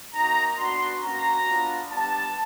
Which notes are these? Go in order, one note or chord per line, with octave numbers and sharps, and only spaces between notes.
A#3 D#4 F#4 A#5
B3 D4 F#4 C6
A#3 C#4 F#4 A#5
B3 D4 F4
G3 B3 D4 A5